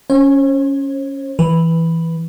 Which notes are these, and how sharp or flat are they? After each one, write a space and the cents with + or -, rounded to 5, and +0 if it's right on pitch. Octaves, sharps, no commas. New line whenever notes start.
C#4 +0 C5 +45
E3 +0 B4 +0